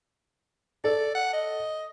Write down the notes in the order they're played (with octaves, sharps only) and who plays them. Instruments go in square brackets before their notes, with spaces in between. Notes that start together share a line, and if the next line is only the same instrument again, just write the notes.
[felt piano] A4 [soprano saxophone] D5
[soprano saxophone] F#5
D#5